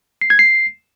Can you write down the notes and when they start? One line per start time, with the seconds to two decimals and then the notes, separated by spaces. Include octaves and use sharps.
0.22 C7
0.30 G#6
0.39 C7